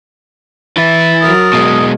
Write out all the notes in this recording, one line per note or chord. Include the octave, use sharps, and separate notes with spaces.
E3 E4 A6
F#3 A#4 D#6
B2 G#3